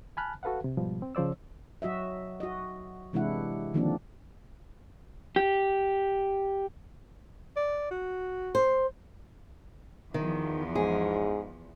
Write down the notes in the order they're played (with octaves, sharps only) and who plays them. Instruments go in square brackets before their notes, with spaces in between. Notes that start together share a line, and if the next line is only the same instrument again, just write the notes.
[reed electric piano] G#5 A5 B5 F6 F#6
F#4 A4 B4 F5 F#5
C3
G#2 B2 F3 G3
C4
C#3 F3 C5 D5 E6
[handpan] F#3 F#4 D#5 E5
F#4 D#5
C3 E3 G#3 D4 E4 F#5
D3 D#3 F3 A#3 C4 D4
[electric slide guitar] G4
[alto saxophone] D5
F#4
[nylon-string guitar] C5
[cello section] E2 F3 [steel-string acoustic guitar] D#3
[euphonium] G#2 [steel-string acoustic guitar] G#4